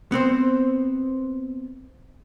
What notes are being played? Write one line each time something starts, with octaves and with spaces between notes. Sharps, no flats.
B3 C4 C5